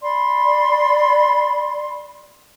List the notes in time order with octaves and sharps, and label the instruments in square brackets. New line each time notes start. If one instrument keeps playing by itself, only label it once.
[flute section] D5 B5 C6